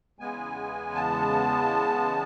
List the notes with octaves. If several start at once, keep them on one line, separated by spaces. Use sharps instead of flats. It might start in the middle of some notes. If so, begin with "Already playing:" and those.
E2 C#3 G#3 B3 G#5
A5